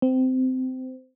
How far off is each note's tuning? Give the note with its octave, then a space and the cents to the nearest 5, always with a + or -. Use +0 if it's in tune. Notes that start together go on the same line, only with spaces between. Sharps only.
C4 -20